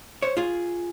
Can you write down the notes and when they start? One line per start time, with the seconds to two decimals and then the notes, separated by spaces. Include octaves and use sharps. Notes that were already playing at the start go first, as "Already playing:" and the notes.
0.22 C5 C#5
0.37 F4 G#4